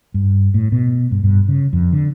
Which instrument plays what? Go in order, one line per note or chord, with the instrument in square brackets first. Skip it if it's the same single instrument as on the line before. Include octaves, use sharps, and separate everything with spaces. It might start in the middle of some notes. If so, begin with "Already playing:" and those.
[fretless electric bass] G2
A2
B2
G2
G2
C#3
F2
D3